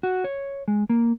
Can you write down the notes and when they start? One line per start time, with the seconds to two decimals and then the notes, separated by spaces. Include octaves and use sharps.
0.03 F#4
0.24 C#5
0.68 G#3
0.90 A#3